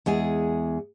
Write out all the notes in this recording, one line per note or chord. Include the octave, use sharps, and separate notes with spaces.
E2 G#3 G#4